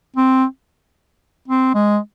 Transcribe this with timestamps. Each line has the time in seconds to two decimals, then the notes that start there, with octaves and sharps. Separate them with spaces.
0.17 C4
1.48 C4
1.75 G#3